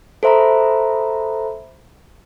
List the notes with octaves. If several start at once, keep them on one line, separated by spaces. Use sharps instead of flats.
A4 C5 E5 A#5 B5